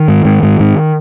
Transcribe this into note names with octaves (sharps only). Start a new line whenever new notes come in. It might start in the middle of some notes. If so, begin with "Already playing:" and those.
Already playing: D#3
G#2
G#2
G#2
G#2